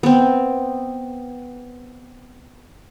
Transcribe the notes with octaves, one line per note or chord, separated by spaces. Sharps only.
B3 C4